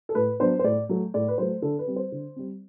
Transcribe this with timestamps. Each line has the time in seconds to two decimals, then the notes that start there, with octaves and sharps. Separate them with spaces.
0.09 A4
0.15 A2 B4
0.40 F#3 B3 D4 C5
0.59 C5
0.64 A2 D5
0.89 F#3 A3
1.14 A2 D5
1.28 B4
1.38 F#3 A3 C5
1.62 D3 A4
1.79 B4
1.88 G3 C4
1.96 C5
2.12 D3
2.36 G3 C4